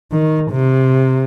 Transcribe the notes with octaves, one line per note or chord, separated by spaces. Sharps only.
D#3
C3